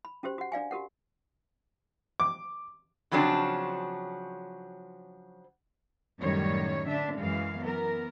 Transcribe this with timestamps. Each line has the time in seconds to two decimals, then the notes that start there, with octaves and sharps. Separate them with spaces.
0.05 B5
0.23 C#4 F#4 G4 C5
0.38 F#4 F#5
0.52 D4 D5 F5 G#5
0.71 F#4 G4 A#4 F#5
2.20 D6
3.11 C#3 F3 F#3 C4 D4
6.20 F#2 A2 D#3 G3 C#5
6.87 D3 D4 E5
7.18 F#2 E3 G#3 F5
7.60 E3 B3 A#4